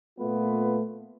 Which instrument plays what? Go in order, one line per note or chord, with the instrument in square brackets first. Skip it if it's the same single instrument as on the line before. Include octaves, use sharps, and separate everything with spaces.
[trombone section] A#2 A3 B3 F4 B4